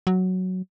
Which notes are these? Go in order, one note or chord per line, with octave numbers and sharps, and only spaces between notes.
F#3